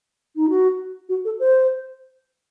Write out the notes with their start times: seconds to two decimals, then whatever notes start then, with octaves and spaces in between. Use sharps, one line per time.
0.36 D#4
0.49 F#4
1.09 F#4
1.25 A4
1.40 C5